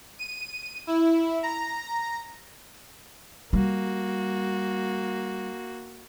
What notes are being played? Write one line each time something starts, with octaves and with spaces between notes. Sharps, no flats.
D#7
E4
A#5
G3 A#3 F#4